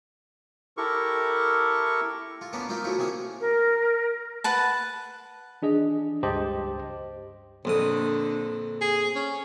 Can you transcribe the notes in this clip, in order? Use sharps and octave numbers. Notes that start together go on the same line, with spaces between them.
E4 G4 A4 A#4 C#6
F4
A#3 B3 C#4 D4 A#4 B4
D#4 F4 A#4 C5 E5
F3 F#3 A3 A#3 E4
C3 G#3 A#3 C#4 G#4
A#4
B4 F#5 A5
E3 D4 G#4 D#5
C#2 G2 G4 C5 D#5 A5
A#1 F2 D3 D#6
G#4
C#4